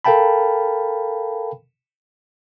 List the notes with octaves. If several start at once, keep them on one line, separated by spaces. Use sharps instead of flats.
A4 A#4 F5 G5 A5 B5